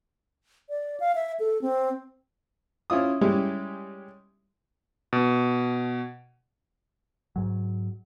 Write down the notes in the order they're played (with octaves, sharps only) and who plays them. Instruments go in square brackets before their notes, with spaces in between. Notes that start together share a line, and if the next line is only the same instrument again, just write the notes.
[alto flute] D5
F5
E5
A4
C4
[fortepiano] C#4 E4 F4 D#6
G3 G#3 C#4 E4 G4
[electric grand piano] B2
[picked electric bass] G#2 F#3